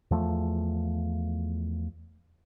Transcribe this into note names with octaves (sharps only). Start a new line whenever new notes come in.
E2 F3 A3